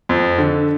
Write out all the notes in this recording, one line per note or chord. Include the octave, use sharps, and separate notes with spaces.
F2
D3